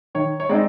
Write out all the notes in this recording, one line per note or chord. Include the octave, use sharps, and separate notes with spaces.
D#3 C#5
C#5
G#3 C4 D#4 D5